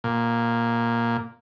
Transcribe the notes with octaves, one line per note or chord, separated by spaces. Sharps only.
A#2